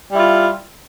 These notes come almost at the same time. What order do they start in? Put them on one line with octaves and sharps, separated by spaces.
G3 E4 F4